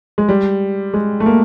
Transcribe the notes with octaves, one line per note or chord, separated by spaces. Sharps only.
G#3
G3
G#3
A3
A#3